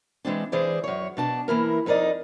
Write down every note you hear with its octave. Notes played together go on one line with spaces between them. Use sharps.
E3 G#3 C4 D4
E3 G#4 C5 D5
F#2 C#5
B2 D4 A5
E3 A#3 E4 A#4
F2 D#4 A#4 D5 D#5